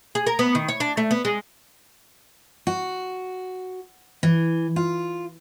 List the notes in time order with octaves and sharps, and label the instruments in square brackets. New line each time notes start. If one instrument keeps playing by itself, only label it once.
[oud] G#4
A#4
B3
D#3
C#5
D4
A3
B3
G#3
[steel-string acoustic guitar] F#4
E3
F4